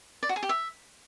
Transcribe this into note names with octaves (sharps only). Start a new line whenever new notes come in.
D5
F#4
G#4
G4
E5